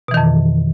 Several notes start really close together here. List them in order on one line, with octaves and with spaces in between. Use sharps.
B2 E3 D#3 F2